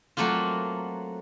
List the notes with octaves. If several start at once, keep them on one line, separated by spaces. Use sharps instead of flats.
F#3 A3 A#3 C4 F4